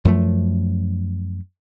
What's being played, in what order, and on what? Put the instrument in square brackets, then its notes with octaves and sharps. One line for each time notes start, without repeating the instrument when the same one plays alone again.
[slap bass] F#2 F3 A3